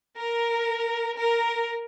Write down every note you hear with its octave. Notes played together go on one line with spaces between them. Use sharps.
A#4
A#4